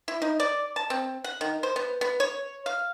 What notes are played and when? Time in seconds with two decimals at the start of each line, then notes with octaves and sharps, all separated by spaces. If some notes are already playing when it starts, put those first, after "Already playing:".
0.08 E4
0.22 D#4
0.40 D5
0.76 A5
0.90 C4
1.24 F#5
1.41 D#3
1.63 C5
1.76 B3
2.01 B3
2.20 C#5
2.66 F5